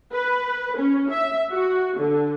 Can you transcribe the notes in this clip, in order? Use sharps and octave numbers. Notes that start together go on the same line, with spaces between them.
B4
C#4
E5
F#4
D3